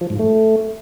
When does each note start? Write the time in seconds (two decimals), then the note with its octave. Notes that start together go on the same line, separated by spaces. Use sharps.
0.01 F3
0.10 G#2
0.19 A3